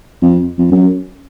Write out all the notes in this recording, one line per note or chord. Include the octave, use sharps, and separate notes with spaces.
F2
F2
F#2